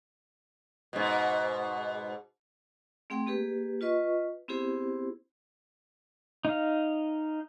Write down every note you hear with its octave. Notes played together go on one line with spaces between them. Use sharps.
G#2 B2
A3 C4 G#4 F#5 G5
A#3 G4 G#4 B4
F4 B4 D#5 C#6
B3 C4 E4 G4 G#4 C5
D#4 F5